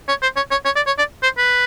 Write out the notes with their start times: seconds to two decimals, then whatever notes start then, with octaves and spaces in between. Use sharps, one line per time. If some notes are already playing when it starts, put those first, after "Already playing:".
0.08 C#5
0.22 C5
0.36 C#5
0.51 C#5
0.65 C#5
0.76 D5
0.86 C#5
0.98 D5
1.23 C5
1.38 B4